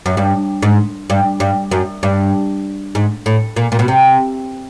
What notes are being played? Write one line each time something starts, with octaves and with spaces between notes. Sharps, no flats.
F#2
G2
G#2
G2
G2
F#2
G2
G#2
A2
A#2
A#2
B2
C3